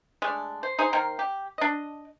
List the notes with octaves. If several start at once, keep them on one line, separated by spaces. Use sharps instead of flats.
G#3 A3 D4
C5
D#4 G#4 C5
D#3 A#3 A#4 C5
G4
D4 D#5